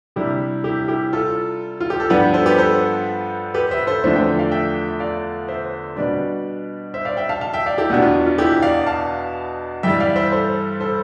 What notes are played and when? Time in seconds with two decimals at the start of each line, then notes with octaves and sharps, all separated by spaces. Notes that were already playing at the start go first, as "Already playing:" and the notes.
0.16 C3 G3 D4 E4 G4
0.64 E4 G4
0.88 E4 G4
1.13 F4 A4
1.80 F4
1.90 G4
2.00 A4
2.10 G2 F3 B3 D4 G4 B4
2.34 A4 C5
2.46 G4 B4
2.58 A4 C5
3.54 G4 B4
3.71 C5 E5
3.87 A4 C5
4.04 E2 D3 F3 A3 D4 C5 E5
4.15 E5 G5
4.39 D5 F5
4.52 E5 G5
4.88 E5
5.00 D5 F5
5.48 C5 E5
5.96 B2 G3 D4 B4 D5
6.94 C5 E5
7.05 D5 F5
7.17 E5 G5
7.29 F5 A5
7.41 F5 A5
7.53 E5 G5
7.66 D5 F5
7.78 E4 G4
7.90 E2 B2 B3 D4 E4
8.02 F4
8.26 F4
8.38 E4 G4
8.62 D5 F5
8.86 F5 A5
9.83 G2 E3 G3 E5 G5
10.00 D5 F5
10.16 C5 E5
10.32 A4 C5
10.80 A4 C5